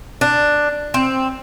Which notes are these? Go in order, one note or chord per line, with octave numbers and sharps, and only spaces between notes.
D4
C4